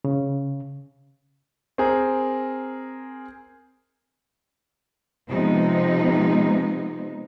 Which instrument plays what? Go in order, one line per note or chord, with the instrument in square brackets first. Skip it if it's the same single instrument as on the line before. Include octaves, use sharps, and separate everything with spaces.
[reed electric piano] C#3
[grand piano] C4 G#4 A#4
[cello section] C3 F3 G#3 B3 D#4